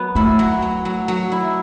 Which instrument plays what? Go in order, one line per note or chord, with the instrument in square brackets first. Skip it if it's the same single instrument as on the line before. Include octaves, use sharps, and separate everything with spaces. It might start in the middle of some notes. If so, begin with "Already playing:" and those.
Already playing: [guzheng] F#3 B3
[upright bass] A3 [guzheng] E4
[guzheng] F#3
F#3
F#3
F#3
E4